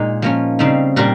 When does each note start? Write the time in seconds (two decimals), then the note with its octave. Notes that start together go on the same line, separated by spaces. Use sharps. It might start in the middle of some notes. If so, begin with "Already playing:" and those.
Already playing: A#2 G#3 D#4
0.22 F3 A#3 C#4
0.59 C#3 G3 C4 D#4
0.96 A#2 G3 C4 A#4